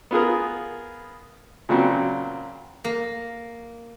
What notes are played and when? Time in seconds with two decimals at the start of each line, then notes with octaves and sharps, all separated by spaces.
0.11 B3 F4 G#4 A#4
1.69 A#2 C#3 F#3 C4
2.84 A#3